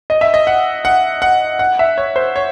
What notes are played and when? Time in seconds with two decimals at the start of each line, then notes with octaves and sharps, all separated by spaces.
0.10 D#5
0.21 E5
0.34 D#5
0.47 F#5
0.85 F#5
1.22 F#5
1.59 F#5
1.79 E5
1.98 C#5
2.16 C5
2.36 C#5